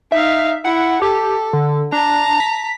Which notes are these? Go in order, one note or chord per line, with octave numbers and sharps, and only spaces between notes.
D#4 E5 F5
E4 F#5
G4 A4
D3
D4 A5 A#5
B6